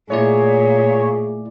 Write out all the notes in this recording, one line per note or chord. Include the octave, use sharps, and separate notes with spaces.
A#2 A3 E4 G#4 C#5 D5